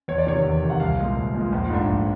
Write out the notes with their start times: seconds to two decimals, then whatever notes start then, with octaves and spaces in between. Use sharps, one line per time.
0.08 E2 C#5
0.18 D5
0.26 C3 D#3 C#5
0.44 E2
0.63 C3 D#3
0.70 F#5
0.80 C2 F5
0.99 A#2 F3 G#3
1.17 C2
1.34 A#2 F3 G#3
1.52 A#1
1.69 G#2 F3 A3 D4
1.88 A#1